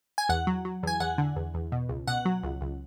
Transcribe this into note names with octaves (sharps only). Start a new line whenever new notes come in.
G#5
E2 F#5
F#3
F#3
E2 G#5
E2 F#5
D3
E2
E2
B2
C#2
B2 F#5
F#3
C#2
C#2